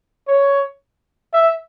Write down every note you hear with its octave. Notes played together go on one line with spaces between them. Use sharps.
C#5
E5